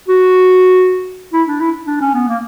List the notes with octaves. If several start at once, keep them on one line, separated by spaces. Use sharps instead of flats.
F#4
E4
D4
E4
D4
C#4
B3
A#3